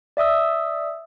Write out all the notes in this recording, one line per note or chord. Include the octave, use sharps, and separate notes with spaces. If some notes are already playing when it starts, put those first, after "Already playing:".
D5 E5 D#6 E6